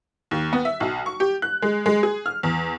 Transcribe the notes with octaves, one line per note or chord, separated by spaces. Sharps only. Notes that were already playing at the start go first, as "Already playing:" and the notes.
D#2
B3
E5
B1
C#6
G4
F#6
G#3
G#3
G#4
F6
E2